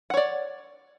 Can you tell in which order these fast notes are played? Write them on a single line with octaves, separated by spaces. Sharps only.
F#5 C#5 D5